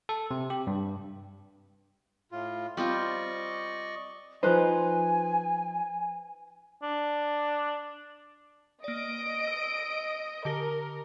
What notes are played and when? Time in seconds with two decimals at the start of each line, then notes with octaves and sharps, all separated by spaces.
0.09 A4
0.31 C3
0.50 G4
0.67 G2
2.32 A2 F4
2.77 G3 C4 F4 D5 D#5 C#6
4.43 F3 D#4 B4 C5 G#5
6.83 D4
8.84 A#3 D5 D#5 D7
9.47 E6
10.45 D3 G4 A#4 A#6